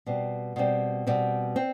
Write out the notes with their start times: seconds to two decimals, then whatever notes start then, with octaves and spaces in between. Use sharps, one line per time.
0.06 B2 G3 C4
0.56 B2 G3 C4
1.07 B2 G3 C4
1.56 C4